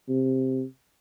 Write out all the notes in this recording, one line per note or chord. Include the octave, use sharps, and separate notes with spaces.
C3